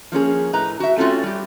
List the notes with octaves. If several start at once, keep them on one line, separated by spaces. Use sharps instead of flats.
F3 A#3 C#4 G#4
A2 B4 D#5 A#5
F#4 E5
A3 C4 C#4 F4 F#4
G3 G4